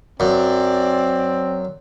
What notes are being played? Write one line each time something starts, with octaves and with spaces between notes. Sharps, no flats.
F#2 C4 D5